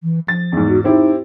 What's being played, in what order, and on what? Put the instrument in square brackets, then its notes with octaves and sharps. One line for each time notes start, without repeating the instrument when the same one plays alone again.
[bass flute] E3
[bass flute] F3 [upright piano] A6
[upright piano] E2 G#2
[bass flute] F#4
[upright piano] C4 E4 G4 [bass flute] D#4